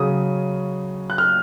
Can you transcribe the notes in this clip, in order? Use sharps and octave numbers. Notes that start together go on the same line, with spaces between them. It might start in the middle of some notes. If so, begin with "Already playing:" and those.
Already playing: C#3 F#3 C#4 D#6
F#6
F6